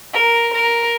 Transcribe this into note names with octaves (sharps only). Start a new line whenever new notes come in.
A#4
A#4